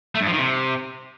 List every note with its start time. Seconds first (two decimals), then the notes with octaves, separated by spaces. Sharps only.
0.15 A3
0.21 G2
0.27 F3
0.33 D#3
0.39 C3